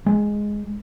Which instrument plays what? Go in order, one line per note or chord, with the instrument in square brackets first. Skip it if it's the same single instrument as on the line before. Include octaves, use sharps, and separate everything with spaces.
[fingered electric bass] G#3